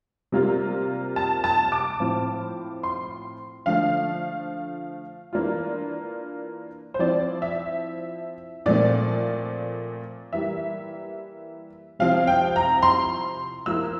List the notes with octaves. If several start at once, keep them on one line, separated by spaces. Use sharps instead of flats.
C3 G3 A#3 F4
A5
A5
D6
A2 F3 C4 F4
C6
D3 F3 A3 F5
E3 A#3 D4 F4
C5
F3 C4 E4 D5
E5
A#2 F3 A3 C4 D5
E3 G3 A#3 E5
C3 F3 C4 E4 F5
G5
A#5
C6
F3 A#3 E4 E6